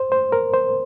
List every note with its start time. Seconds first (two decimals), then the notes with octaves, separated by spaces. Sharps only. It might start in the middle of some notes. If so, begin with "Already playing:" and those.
Already playing: C5
0.12 C5
0.32 A#4
0.53 C5